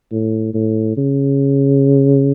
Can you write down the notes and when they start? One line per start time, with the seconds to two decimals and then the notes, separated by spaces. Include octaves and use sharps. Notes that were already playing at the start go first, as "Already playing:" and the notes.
0.12 A2
0.54 A2
0.97 C#3